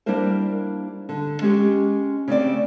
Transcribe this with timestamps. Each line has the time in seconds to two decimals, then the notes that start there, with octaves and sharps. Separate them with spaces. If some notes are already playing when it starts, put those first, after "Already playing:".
0.06 G3 A#3 D4 E4 A#4 C5
1.09 D3
1.42 G#3 C#4 G4
2.28 C#3 A3 C4 D5